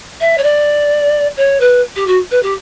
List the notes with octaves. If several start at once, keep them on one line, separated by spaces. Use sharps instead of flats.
E5
C#5
D5
C#5
B4
G4
F#4
B4
G4